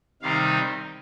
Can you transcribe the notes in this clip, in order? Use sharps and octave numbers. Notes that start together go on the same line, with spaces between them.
C3 D#3 G3 C4 D#4 F5